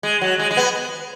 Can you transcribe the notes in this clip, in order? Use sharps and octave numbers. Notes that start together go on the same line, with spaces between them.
G#3
F#3
G#3
G#3
B3